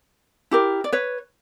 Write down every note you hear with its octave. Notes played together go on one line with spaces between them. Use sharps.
E4 G4 A#4
D5
B4 C#5